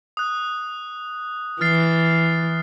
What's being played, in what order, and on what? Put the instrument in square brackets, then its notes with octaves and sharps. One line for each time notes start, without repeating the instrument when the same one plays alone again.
[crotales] D#6 F#6
[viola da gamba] E3 [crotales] F6 A6 C7